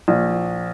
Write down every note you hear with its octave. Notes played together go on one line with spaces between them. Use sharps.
A#1